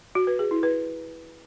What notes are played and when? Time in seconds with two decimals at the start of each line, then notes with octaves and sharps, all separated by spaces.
0.15 F#4
0.27 B4
0.39 G#4
0.51 E4
0.63 B4